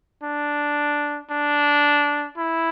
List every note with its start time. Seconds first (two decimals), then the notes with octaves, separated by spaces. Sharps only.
0.23 D4
1.30 D4
2.38 E4